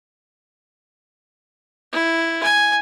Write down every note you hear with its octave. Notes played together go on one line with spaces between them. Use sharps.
E4
G#5